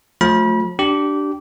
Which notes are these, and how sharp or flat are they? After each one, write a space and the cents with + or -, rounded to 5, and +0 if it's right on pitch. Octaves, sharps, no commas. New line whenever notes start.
F3 +45 A3 +0 B5 -35
D4 +0 G4 -20